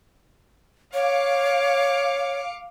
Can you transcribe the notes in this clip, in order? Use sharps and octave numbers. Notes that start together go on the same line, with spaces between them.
C#5 F5 D6 C#7